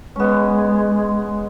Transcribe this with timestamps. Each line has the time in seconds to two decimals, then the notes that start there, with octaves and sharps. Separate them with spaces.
0.16 G#3 B3 C#4